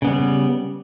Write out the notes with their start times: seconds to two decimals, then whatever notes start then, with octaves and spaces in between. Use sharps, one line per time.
0.02 C#3
0.05 B3
0.07 G3